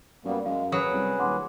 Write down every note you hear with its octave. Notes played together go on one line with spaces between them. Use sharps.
F#2 G3 A#3 B3
F#2 G#3 F5
F#3 C#4 G#4 B4 D#6
C2
D#1 F#5 C6 D6